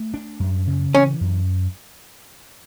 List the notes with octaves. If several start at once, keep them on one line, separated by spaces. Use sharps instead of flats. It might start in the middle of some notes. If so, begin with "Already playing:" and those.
Already playing: A3
D4
F#2
C#3
E3 C#4
F#2